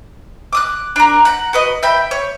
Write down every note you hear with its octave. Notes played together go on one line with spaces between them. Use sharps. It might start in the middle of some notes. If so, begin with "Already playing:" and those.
D6 D#6 F#6
D4 A#4
F#5 A#5
F#4 B4 D#5
E5 G5 B5
C#5